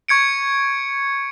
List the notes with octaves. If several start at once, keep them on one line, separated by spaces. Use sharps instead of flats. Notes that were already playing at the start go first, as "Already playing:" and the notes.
C#6 G#6 C#7 D7